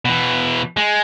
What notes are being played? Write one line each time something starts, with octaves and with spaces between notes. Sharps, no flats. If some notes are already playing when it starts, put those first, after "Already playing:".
B2 E3
G#3